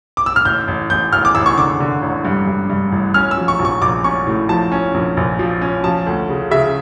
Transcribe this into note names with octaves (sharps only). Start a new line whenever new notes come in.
D6
E6
F6
A1 G6
A1
A1 G6
A1 F6
D6
A1 E6
C#6
D3 D6
D3
A1
G2
G2
G2
A1
C#4 F6
E6
F3
C#6
A#1
C#6
A#1 D6
C#4 C#6
A2
F3 A5
C#4
A#1
A#1
F3
C#4
F3 A5
D2
C#3
C#3 E5